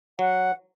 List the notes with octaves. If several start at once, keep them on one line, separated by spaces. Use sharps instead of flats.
F#3 F#5